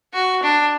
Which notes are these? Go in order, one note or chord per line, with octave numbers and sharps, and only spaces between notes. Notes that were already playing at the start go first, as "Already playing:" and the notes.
F#4
D4